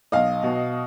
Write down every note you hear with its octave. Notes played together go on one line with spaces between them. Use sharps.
B1 D#5 F5
B2